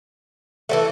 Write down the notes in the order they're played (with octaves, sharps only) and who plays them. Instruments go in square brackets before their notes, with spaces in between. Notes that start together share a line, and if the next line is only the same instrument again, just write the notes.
[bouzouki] E3 F#3 A3 [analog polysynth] A4